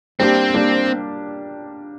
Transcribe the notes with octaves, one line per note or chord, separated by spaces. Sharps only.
G3 A#3 C4 D4 G4
G3 A#3 D4 G4